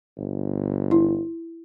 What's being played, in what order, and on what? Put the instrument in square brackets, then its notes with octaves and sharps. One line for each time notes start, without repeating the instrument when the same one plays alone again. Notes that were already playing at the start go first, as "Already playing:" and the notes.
[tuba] G1
[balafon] E4